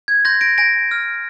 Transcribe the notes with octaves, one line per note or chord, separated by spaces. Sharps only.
G#6
C6 G6 A#6
A#6 D7
G#5 A#6 D7
F6